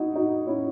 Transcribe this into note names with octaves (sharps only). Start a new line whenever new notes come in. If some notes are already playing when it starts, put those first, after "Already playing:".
Already playing: D#4 E4 F#4
D#4 F#4
C#4 E4